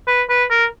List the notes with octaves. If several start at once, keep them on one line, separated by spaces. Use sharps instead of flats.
B4
B4
A#4